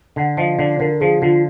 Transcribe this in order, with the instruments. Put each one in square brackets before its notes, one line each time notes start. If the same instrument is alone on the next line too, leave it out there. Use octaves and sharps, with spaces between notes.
[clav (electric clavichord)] D3 [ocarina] F#5
[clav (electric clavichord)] F3 [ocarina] D#5
[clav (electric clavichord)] D3 [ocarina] D5
[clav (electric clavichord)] D3 [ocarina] A#4
[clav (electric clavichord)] F3 [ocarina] G#4
[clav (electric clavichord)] D3 [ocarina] F4